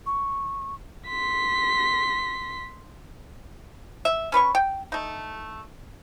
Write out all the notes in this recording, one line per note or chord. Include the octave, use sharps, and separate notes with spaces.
C#6
C6 B6
E5
C#4 B4 C#5 C#6
G5
A3 D#4